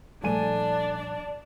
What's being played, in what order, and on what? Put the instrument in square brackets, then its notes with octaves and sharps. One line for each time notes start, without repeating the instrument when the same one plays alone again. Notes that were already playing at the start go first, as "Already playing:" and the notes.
[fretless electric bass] A#2 F3 G3 [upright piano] A3 G#5 D#7 [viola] D4 [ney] D5